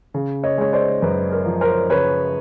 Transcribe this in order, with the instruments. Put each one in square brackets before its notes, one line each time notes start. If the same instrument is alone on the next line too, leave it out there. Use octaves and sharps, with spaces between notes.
[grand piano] C#3
[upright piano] C#5 D#5
[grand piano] G#3 [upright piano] C#5
[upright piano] C5 D5
[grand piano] F#2 [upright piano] B4
[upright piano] A#4
[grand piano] F3
[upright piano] A#4 C5
[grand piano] C#3 [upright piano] B4 C#5